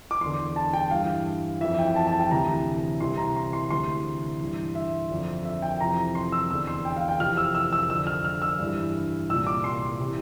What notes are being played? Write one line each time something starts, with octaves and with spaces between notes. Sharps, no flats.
D6
E2 D3 C6
A5
G5
G2 E3 F5
F2 E3 E5
G5
A5
A5
G5
D2 C3 E3 A#5
C2 C3 E3 C6
A#5
C6
C6
D2 C3 E3 C6
G2 E3
E5
F2 D3
E5
G5
F2 C3 E3 A#5
C6
E6
E2 D3 E6
C6
G5
F5
G5
F2 C3 E3 F6
E6
E6
E6
F2 D3 E6
F6
F6
E6
G2 E3
C2 A#2 E6
D6
C6
C3 E3